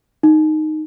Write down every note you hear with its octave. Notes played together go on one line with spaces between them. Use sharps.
D#4